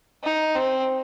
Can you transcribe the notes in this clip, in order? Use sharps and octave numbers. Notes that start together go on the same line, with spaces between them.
D#4
C4